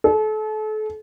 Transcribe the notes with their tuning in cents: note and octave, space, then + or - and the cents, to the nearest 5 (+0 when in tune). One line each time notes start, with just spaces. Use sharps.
A4 -35